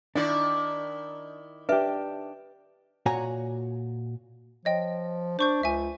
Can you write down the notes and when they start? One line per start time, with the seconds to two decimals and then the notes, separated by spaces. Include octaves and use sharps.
0.15 D#3 D4 E4 D5
1.69 D4 G4 B4 E5
3.06 A#2 F#4 C#5 F#5 G#5 A#5
4.65 F3 C#5 D#5 G5
5.39 D4 C5 C#6 G6
5.63 C#2 E5 G#5